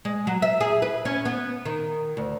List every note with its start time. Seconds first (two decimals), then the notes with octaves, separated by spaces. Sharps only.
0.05 G#3
0.27 F#3
0.42 E5
0.60 G#4
0.82 B4
1.05 C#4
1.25 B3
1.65 D#3
2.17 D2